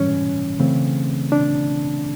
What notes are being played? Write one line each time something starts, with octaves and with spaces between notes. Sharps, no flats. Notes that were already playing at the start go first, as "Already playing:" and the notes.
Already playing: G#2 E3 G3 C#4
C#3 E3 A3 C4
D4